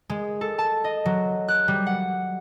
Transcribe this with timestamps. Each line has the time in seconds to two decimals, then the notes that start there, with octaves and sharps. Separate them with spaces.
0.10 G#3
0.41 A4
0.58 A5
0.84 D#5
1.06 F#3
1.48 F#6
1.68 G3
1.86 F#5